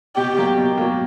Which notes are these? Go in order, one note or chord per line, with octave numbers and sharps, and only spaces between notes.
B2 G4
F#3 A#3
B2
F#3 A#3